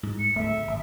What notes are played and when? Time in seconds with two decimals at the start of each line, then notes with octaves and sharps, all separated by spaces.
0.03 G#2
0.18 C#7
0.35 D1 A3 E5
0.67 G#1